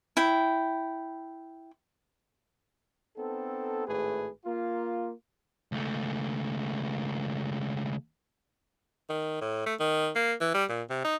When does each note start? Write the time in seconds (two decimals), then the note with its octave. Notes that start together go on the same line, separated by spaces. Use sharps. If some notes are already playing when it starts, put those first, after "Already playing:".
0.17 E4 G5
3.17 B3 C4 D#4 A4
3.87 G#1 A2 A3 G#4 B4
4.45 A#3 F4
5.72 C#2 A3
9.10 D#3
9.41 A2
9.66 A3
9.80 D#3
10.16 A#3
10.41 E3
10.54 G3
10.69 A#2
10.90 C3
11.05 D#4